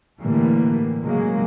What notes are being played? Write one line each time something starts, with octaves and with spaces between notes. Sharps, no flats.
A2 D3 E3 G3 A3 A#3
C#3 F#3 G#3 A#3